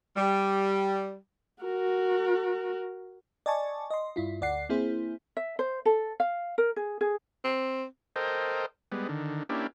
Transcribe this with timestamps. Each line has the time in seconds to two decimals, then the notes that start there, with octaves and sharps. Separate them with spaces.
0.16 G3
1.63 F#4 A#4
3.46 D5 D#5 G#5 A5 C#6
3.90 D#5 C6
4.16 G2 E4 F4
4.41 D2 D5 F#5 C7
4.69 A#3 C4 E4 G#4 C5
5.37 E5
5.59 C5
5.85 A4
6.20 F5
6.58 A#4
6.76 G#4
7.01 G#4
7.44 C4
8.16 A4 A#4 C5 D#5 G5
8.92 G3 G#3 B3
9.09 D3 D#3
9.49 A#3 C#4 D4 E4 G4